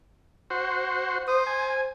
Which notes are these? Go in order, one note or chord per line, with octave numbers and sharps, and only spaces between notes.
F#4 C5
C5 D#6
G#5